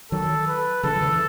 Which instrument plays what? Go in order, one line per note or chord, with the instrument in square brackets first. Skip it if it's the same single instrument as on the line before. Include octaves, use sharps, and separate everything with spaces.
[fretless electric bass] D#3 F#3 [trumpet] A4
[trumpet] B4
[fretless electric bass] C#3 E3 [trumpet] A4
[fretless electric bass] F#3
C#3 E3
E3